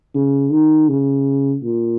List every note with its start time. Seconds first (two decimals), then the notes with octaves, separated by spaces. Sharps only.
0.15 C#3
0.52 D#3
0.89 C#3
1.64 A#2